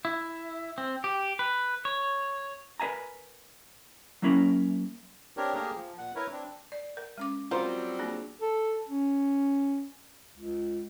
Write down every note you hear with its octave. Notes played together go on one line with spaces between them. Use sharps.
E4
C4
G4
B4
C#5
A#4 B4 E5 G#5 A#5
F#3 A#3 C#4 E4 A#4
C4 D4 G4 A#4 C#5
A3 A#3 G4 G#4 A#4
F3
A#2 F#5
E4 A#4 B4 C#5
C4 D4
D5
A#4
G#3 C#4 D6
F#3 G3 C4 F4 A#4 C5
A#3 D4 G#4
A4
C#4
C#2